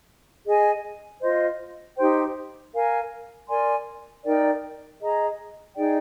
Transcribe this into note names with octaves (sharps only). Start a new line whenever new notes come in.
G#4 D#5 G#5
F4 C5 D#5
D#4 G4 C5 G5
A#4 F5 G#5
A#4 D5 G#5 C6
D#4 A#4 D5 G5
G#4 D#5 A#5
D#4 G#4 D5 G5